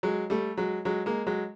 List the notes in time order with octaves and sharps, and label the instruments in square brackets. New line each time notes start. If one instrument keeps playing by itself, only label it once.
[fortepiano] F#3 G#3
G3 A3
F#3 G#3
F#3 G#3
G#3 A#3
F#3 G#3